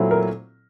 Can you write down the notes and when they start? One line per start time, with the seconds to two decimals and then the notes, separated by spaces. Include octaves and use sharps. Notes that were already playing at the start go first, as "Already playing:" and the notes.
Already playing: A#2 F#3 A3 C4 E4
0.11 A#4